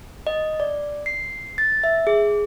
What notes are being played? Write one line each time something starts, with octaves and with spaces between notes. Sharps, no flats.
D#5
D5
C7
A6
E5
G#4